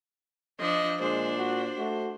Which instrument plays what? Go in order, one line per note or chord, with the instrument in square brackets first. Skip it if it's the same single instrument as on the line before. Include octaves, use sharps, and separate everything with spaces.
[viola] F3 D4 [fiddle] D#5
[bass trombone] A#2 [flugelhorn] G#3 [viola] D4 [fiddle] C5
[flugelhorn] F#4
[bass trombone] A3 [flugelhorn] F#4